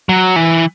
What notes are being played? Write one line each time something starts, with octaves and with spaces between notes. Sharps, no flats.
F#3
E3